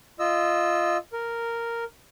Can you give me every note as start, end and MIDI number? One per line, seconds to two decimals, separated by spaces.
0.19 0.97 65
0.19 0.97 75
0.19 0.97 88
1.13 1.84 70